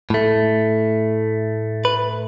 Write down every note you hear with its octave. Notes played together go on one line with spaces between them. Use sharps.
A2 A3
B4